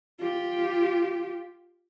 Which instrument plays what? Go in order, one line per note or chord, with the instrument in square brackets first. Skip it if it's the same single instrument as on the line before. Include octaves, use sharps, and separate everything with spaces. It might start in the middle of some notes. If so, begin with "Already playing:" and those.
[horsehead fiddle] F4 G4